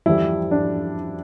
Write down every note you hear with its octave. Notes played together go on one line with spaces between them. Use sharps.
F2 E3 G3 E4
D4